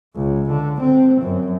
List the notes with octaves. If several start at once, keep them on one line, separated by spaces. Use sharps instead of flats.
C#2
D3
C4
F#2